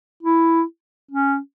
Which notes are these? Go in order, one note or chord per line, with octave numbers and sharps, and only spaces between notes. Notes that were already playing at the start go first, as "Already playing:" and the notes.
E4
C#4